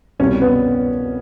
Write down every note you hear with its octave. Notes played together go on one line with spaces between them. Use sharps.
C2 B2 G3 C#4
B3